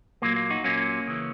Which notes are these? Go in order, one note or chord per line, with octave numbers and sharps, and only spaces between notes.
A#2 F#3 A#3
A#3
D#4 F#4
A#2 F#3 A#3 C#4
C#3 E3